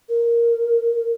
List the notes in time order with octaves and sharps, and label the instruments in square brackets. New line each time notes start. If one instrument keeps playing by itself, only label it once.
[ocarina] A#4